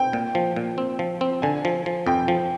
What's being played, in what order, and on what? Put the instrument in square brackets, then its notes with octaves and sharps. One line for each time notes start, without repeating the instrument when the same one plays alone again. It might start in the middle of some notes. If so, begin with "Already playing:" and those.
Already playing: [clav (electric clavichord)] C4 [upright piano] G5
[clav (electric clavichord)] A#2
F3
A#2
C4
F3
C4
[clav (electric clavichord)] D3 [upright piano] G#5
[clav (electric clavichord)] F3
F3
[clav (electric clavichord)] F2 [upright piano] G5
[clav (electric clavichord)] F3